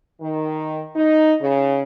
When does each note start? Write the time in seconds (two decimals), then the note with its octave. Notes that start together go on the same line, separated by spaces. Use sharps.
0.21 D#3
0.95 D#4
1.41 C#3